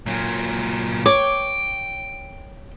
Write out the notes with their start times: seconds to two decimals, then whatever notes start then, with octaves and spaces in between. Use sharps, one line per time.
0.06 A#2 F#3
1.06 C#5 G5 D6